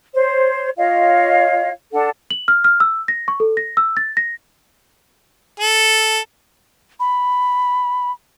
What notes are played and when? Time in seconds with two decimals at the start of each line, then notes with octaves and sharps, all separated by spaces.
0.13 C5 C#5
0.77 F4 C#5 D#5 F5
1.93 D4 A4 F#5
2.30 F#7
2.48 F6
2.64 F6
2.80 E6
3.08 A#6
3.28 C#6
3.40 A4
3.57 A#6
3.77 E6
3.97 A6
4.17 A#6
5.60 A4
7.00 B5